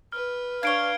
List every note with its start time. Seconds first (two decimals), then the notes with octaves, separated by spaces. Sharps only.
0.12 B4 F6
0.63 D4 C#5 F5 G#6 D7 G7